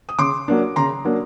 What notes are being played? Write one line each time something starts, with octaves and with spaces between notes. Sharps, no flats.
D#6
C#3 C6 D6
F#3 A#3 D4
C#3 A#5 C6
F#3 A#3 D4